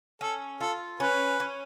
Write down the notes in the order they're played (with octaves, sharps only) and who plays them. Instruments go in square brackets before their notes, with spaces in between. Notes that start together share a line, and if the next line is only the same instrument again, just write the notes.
[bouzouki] C#4 [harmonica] A4
[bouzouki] F4 [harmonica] A4
[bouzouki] C#4 [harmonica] B4
[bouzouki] C#4